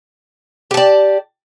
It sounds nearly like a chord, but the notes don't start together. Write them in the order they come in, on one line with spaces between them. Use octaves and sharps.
G4 A5 D5